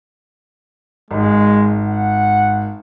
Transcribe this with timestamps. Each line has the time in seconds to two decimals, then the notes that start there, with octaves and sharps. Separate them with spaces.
1.11 G#1 G#3
1.86 F#5